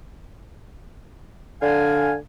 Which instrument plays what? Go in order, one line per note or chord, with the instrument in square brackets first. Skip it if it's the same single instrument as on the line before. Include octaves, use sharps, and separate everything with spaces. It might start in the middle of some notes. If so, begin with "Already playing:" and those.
[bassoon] D3 [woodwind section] D4 F5 G#5